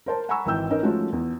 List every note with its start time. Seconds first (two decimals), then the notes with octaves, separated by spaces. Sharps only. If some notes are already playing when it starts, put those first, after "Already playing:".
0.06 A#4 C5 A5
0.29 F#5 G#5 A#5 B5 C#6 E6
0.46 G#1 E3 G5 E6 G6
0.70 C#4 D#4 A#4 B4 D#5
0.83 F3 G#3 A3 C#4 F#4
1.12 E2